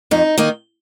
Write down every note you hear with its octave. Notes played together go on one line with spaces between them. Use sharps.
F2 D#4
D#3 A#3 D#4